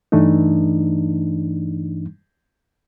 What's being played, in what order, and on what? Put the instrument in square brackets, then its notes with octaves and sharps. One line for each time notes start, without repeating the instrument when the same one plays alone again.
[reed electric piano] G2 E3 A3 D4 D#4